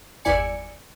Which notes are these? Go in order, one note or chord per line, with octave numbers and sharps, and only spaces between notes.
G1 E2 E4 D5 G#5 C#7